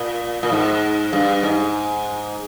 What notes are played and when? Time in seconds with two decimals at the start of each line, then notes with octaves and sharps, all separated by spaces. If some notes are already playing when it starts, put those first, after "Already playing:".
Already playing: A#2
0.43 A#2
0.52 G#2
1.13 G2
1.43 G#2